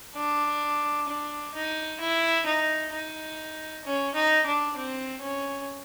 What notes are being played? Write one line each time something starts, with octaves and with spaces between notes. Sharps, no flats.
D4
D4
D#4
E4
D#4
D#4
C#4
D#4
D4
C4
C#4